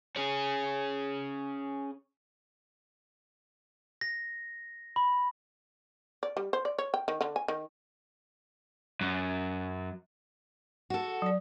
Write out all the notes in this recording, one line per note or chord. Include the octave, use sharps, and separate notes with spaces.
C#4 G#4
A#6
B5
D5
G3
C5
D5
C#5
G5
D#3
D3
G#5
D#3
F#2
F#4 A4
F#3 D5